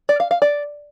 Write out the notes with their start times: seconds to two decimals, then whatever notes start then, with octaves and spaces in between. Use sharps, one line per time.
0.09 D5
0.20 F5
0.31 F5
0.42 D5